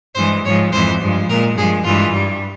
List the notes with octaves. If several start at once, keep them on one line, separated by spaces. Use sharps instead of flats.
G2 E3 G#3 C5
G#2 F3 G#3 C#5
F2 E3 G#3 C5
G2 F3 G#3
A#2 G#3 A#4
G2 F3 G#3 G#4
G2 E3 G#3 F4
G2 G3